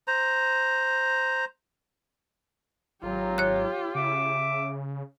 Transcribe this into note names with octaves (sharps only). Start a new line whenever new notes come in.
C5 A#5
G#1 F#3 F4 G4
C#5 F#6
C#3 E5 D6